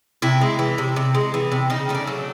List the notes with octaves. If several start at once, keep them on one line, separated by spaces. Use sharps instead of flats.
C3 E4
G#3
E3
C3
C3
G#3
E3
C3
C#3 D#4
A3 D#4
D4
F#3